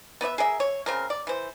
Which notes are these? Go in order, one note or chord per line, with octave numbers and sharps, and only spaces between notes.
B3 B4 D5 E5
G#4 A#4 D#5 E5
C#5
C#3 C4 A#4
D5
E3 C5